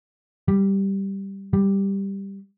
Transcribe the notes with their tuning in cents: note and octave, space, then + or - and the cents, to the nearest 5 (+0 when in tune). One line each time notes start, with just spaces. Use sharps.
G3 +0
G3 +5